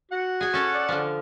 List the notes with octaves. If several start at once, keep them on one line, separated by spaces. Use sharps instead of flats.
F#4 F#5
G#4 G#5
C#4 A4
D5
D3 F3